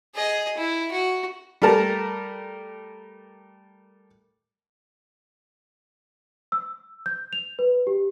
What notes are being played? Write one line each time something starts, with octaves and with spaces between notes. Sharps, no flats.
G#4 D#5
E4
F#4
G3 A3 A#4 A5
E6
G6
F7
B4
G4